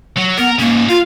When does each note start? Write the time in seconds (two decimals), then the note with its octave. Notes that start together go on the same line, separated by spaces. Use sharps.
0.17 F#3
0.38 B3 A#4
0.59 G#2 C#3 A#3
0.89 F4 F5